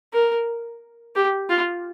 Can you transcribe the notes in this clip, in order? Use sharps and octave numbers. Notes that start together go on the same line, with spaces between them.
A#4
G4
F4